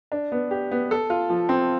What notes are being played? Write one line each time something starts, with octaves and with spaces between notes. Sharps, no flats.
D4
B3
G4
B3
A4
F4
F3
C4